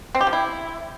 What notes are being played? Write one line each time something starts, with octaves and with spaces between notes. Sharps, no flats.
C4
G4
F3
E4